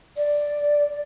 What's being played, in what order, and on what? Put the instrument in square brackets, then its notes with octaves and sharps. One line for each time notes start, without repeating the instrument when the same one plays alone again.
[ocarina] D5